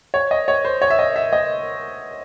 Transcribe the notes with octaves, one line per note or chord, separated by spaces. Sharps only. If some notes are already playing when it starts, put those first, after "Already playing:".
C#5
D#5
C#5
C5
C#5
E5
D#5
E5
D#5